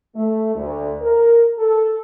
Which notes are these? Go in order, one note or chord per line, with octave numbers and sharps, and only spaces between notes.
A3
D2
A#4
A4